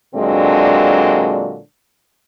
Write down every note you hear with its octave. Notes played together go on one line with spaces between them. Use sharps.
A#2 D3 F#3 G#3 C4 D4